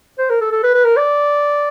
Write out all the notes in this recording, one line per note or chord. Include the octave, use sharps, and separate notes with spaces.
C5
A#4
A4
A4
B4
B4
A#4
D5